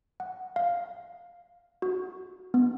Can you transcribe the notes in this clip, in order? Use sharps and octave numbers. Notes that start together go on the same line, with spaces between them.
F#5
F5
F#4
B3